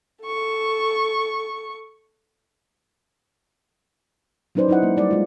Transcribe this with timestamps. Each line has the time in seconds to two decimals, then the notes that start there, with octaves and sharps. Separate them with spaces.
0.24 A4 C#6
4.55 F#3 C#4 D#4 B4 C5 D5
4.68 F#3 D#4 E4 D#5 F#5
4.82 G#3 A#3
4.97 G3 D5
5.11 G#3 F4